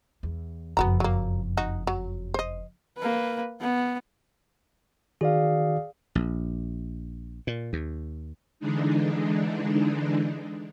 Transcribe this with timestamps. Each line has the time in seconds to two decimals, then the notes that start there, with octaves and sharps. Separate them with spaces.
0.23 E2
0.77 F#1 F2 B3 F#4 A#5
1.00 F#3 A#3
1.57 D#4 F#4
1.87 F#3
2.34 C5 D#5
2.98 A#3 B4
3.61 B3
5.21 D#3 F#4 G#4 D5 F5
6.15 A#1
7.47 A#2
7.73 D#2
8.60 D3 E3 G#3 D4 D#4